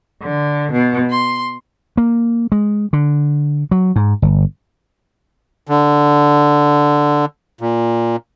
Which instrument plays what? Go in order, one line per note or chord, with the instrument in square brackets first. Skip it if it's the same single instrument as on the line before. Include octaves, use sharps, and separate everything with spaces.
[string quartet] D3
B2
C6
[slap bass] A#3
G#3
D3
F#3
G#2
G1
[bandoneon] D3
A#2